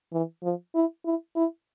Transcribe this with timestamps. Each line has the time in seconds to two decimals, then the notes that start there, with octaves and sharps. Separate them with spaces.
0.13 E3
0.43 F3
0.75 E4
1.06 E4
1.36 E4